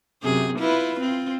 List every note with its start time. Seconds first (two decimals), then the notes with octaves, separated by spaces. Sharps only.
0.23 F#2 C3 G#4
0.58 E4 F4 B4
1.00 C4 F4